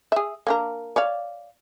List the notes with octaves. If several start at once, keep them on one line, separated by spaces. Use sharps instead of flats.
G#4 E5
A#3 D4 A#4
C#5 D5 F5